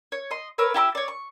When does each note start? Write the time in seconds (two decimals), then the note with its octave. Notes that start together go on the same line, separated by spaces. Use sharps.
0.12 C#5
0.31 D#5 C6
0.58 A#4 B4 C#5 E6
0.74 E4 G4 A#5 E6
0.95 C#5 D5
1.08 C#6